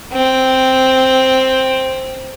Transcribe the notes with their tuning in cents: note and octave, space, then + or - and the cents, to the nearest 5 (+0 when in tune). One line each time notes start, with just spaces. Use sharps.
C4 +0